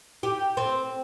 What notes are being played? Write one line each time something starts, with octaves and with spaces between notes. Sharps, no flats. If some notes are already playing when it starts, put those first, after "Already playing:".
G4
C4